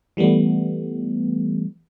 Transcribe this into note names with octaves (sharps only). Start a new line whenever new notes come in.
E3 G3 A3 B3